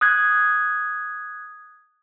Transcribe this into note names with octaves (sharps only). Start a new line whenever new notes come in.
D#6 F#6 G#6